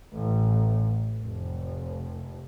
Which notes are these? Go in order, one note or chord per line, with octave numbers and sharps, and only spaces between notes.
A1
F1